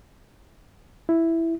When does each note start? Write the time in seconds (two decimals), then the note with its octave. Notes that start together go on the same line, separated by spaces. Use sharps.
1.09 E4